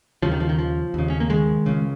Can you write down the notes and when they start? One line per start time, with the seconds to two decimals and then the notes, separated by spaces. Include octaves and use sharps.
0.22 D#2 C#3 F3
0.31 D#3
0.40 F3
0.49 D#3
0.59 F3
0.94 D#2 C#3
1.10 C#4
1.20 A#3
1.30 D#3 G#3
1.66 C#2 C#3